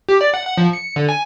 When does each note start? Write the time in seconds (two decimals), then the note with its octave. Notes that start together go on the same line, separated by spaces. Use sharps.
0.09 G4
0.21 D5
0.34 F#5
0.46 F#5
0.57 F3
0.73 C#7
0.96 D3
1.09 G#5